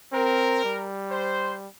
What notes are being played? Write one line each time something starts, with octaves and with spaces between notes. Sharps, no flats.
C4 A#4
G3
C5